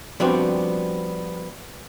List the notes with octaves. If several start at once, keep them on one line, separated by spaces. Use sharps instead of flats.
F3 G3 B3 C4 D4 F#4